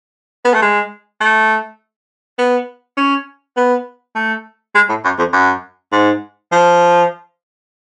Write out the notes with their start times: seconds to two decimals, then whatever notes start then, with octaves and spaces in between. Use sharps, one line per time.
0.45 B3
0.54 A3
0.62 G#3
1.21 A3
2.38 B3
2.97 C#4
3.57 B3
4.15 A3
4.75 G#3
4.89 A2
5.04 F#2
5.18 F2
5.33 F#2
5.92 G#2
6.52 F3